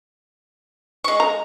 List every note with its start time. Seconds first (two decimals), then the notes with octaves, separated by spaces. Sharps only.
1.04 G#3 C#6
1.20 A#5